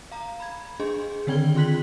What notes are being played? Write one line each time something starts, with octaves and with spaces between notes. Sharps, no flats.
F5 A#5
B5 G#6
D4 G#4 D#5 C6
D3 D#3 C4 G5 G#6 G7
F4 G#4 C6 F#6 B6 F#7